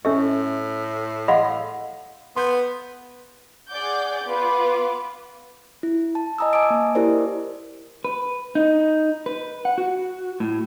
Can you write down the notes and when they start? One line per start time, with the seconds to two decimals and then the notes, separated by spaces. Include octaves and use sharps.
0.05 A2 C#4 A4 E5 C#6
1.28 D#5 F5 F#5 B5 C6
2.36 B3 C6 G6
3.70 G#4 D5 F#5 D6 G6
4.26 B3 F4 B4 D6
5.83 E4
6.15 A5
6.38 D#5 G#5 A#5 D#6 E6
6.53 D#5 G#5 A5 D6 D#6 D7
6.70 A#3
6.95 E4 G4 A#4 C5 D5
8.05 B4
8.55 D#4
9.26 B4
9.65 F#5
9.78 F#4
10.40 A2